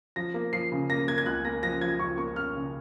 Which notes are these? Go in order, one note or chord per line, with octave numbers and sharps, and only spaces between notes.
F3 A#6
A#3
F3 C7
C#3
A#3 A#6
A#3 G#6
G#6
C#2 F#6
A#3 A#6
F3 A#6
F3 G#6
C#2 C#6
A#3 C#6
A#3 F6
C#3